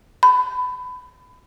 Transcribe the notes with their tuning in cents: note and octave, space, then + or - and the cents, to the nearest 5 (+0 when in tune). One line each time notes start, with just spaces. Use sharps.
B5 +25